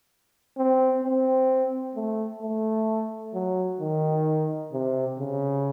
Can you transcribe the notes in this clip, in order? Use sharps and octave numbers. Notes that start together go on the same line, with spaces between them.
C4
C4
A3
A3
F#3
D#3
C3
C#3